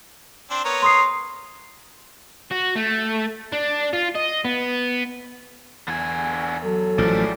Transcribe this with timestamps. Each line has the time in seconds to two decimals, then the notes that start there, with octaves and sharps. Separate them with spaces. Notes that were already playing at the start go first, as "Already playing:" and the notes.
0.50 C4 D4 C6
0.64 B3 A#4 C#5
0.82 C6 D#6 C7
2.52 F#4
2.76 A3
3.52 D4
3.93 F4
4.15 D#5
4.45 B3
5.88 E2 D3 G#5
6.64 F#3 A4
6.98 A1 F3 G#3 A3 D5